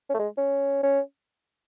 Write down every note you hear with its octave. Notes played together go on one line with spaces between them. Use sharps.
C#4
A3
G#3
C#4
C#4